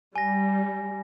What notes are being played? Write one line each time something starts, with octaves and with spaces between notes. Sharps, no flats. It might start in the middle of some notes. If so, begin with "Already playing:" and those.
G3 G#5 A#6